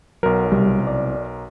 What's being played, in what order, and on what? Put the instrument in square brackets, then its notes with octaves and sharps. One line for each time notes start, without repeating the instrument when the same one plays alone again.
[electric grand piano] B1 A#4 [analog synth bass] F#3
[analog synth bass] C2 [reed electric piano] G3
[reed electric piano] D5